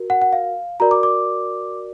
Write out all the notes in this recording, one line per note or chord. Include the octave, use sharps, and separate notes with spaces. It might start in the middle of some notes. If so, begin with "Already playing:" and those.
Already playing: F#4 A#4
F#5
F#5
F5
F#4 A#4 D5 A#5
D6
D6